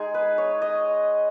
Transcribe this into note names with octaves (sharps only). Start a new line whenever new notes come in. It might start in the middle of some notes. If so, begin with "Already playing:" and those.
Already playing: G#3 D#4 G#4
B4
C#5
D#5